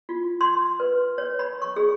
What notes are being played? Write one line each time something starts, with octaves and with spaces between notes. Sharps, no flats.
F4
C6
B4
C#5
B5
C#6
G#4